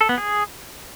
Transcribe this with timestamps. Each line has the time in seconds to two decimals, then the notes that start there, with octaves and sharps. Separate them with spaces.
0.01 A4
0.09 B3
0.18 G#4